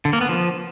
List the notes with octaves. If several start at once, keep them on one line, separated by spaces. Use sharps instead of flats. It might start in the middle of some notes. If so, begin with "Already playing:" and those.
D3
A#3
B3
F3